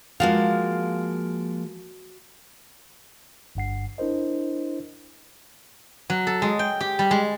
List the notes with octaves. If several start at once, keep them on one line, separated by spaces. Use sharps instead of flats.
F3 G#3 A#3 F#4 F5
G1 G2 F#5 C7
D4 E4 A#4 C5 D#5
F#3
A4
G#3
G5
G4
G3
G#3